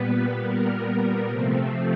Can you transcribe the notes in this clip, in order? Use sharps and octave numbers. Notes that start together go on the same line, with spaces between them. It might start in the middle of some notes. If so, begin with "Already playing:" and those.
Already playing: A#2 G3 B3 B4
A#2 G3 B3 A#4
C3 F3 A3 C4